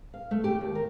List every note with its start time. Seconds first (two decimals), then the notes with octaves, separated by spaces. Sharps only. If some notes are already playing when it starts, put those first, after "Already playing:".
0.14 F5
0.31 A3
0.44 G4
0.61 D#2
0.75 A#4